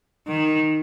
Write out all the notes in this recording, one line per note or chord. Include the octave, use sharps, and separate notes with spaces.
D#3